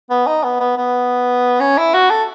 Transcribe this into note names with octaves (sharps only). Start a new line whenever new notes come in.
B3
D#4
B3
B3
B3
C#4
E4
F#4
A4